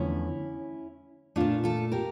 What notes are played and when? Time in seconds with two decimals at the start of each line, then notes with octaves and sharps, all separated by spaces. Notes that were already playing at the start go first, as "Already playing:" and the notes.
Already playing: E2 D3 F3 A3 C#4 E4
1.36 A#2 A3 D4 F4
1.64 F4 A4
1.92 G4 A#4